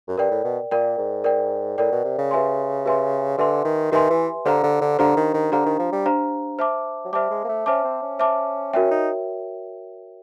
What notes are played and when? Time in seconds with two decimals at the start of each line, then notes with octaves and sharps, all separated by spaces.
0.08 F#2
0.18 G2 A#4 D5 G5
0.31 A2
0.44 B2
0.71 A#2 A#4 D5 G5
0.98 G#2
1.24 A#4 D5 G5
1.78 A2 A#4 D5 G5
1.92 B2
2.04 C3
2.18 C#3
2.31 G4 B4 E5 G#5 C6
2.86 G4 B4 E5 G#5 C6
3.38 D3 G4 B4 E5 G#5 C6
3.65 D#3
3.92 D#3 G4 B4 E5 G#5 C6
4.10 E3
4.45 D3 D4 G4 C5 F5 A#5
4.63 D3
4.81 D3
4.99 D3 D4 G4 C5 F5 A#5
5.16 D#3
5.34 D#3
5.52 D3 D4 G4 C5 F5 A#5
5.66 D#3
5.79 F3
5.92 G3
6.06 D4 G4 C5 F5 A#5
6.59 C5 E5 A5 D6
7.05 F#3
7.13 G3 C5 E5 A5 D6
7.30 G#3
7.44 A#3
7.49 A3
7.66 C#4 C5 E5 A5 D6
7.84 C4
8.02 C#4
8.19 C5 E5 A5 D6
8.73 C#4 F#4 A#4 C#5 E5 G5
8.91 D#4